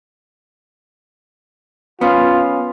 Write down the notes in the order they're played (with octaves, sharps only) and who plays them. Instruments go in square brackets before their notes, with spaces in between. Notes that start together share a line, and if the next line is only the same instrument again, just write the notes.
[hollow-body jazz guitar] B3 C#4 [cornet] F4